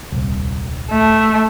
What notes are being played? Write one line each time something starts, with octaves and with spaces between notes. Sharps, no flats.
D#1 C2
A3